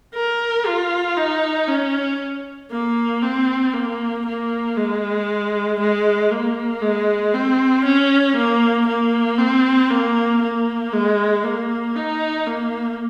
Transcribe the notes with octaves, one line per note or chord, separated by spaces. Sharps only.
A#4
F4
D#4
C#4
A#3
C4
A#3
A#3
G#3
G#3
A#3
G#3
C4
C#4
A#3
A#3
C4
A#3
A#3
G#3
A#3
D#4
A#3